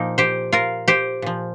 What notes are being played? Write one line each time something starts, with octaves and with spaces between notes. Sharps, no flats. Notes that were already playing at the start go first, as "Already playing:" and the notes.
Already playing: A#2 F3 A#3 D#4
G4 C5
F4 A#4
G4 C5
A#2 F3